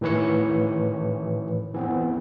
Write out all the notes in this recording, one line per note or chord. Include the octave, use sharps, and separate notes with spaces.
A2 D#3 E3 B4 C#5 C#7
E3 B3 C4